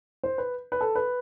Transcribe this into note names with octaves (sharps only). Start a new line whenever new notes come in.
C5
B4
B4
A4
B4